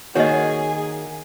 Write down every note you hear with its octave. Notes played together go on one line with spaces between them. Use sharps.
D#3 A#3 F#4 G#4 C#5 D#5